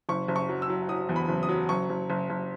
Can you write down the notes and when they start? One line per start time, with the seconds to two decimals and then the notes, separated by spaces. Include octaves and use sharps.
0.09 F#1 C#6
0.28 F#1
0.36 C#6
0.49 F#3
0.62 E6
0.70 F#3
0.89 F#3 D#6
1.09 E2
1.16 B5
1.29 F#1
1.43 D#6
1.49 F#3
1.69 F#1 C#6
1.90 F#1
2.10 F#1
2.30 F#1